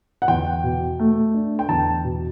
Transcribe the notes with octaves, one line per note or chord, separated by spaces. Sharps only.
F#5
E2 G5
B2
A3
D4
G5
E2 A5
B2